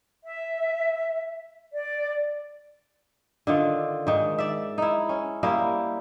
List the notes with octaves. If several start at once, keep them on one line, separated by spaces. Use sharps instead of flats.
E5
D5
D3 D#3 F4
G#2 D#3
D5 E5
D#4 E4
C#4
G3 A#3 E4 D#5